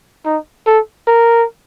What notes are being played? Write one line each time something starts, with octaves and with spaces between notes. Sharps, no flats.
D#4
A4
A#4